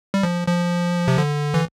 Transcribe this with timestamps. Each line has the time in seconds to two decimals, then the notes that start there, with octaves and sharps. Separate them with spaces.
0.14 G3
0.23 F3
0.48 F3
1.08 C3
1.18 D3
1.54 E3